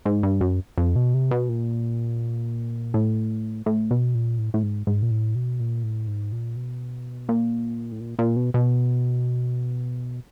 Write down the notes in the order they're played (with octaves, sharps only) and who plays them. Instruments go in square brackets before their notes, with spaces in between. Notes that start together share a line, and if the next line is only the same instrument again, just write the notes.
[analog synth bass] G#2
G2
F#2
F2
B2
C3
B2
A#2
A2
A2
B2
A#2
A2
A2
G#2
G#2
A#2
A2
B2
A#2
A2
G#2
A#2
B2
A#2
A2
A#2
A#2
B2
B2